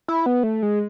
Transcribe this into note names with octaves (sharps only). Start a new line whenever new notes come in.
E4
B3
A3
G#3